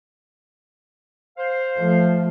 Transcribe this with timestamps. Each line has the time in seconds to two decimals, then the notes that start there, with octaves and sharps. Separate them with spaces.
1.37 C5 F5
1.79 F3 A3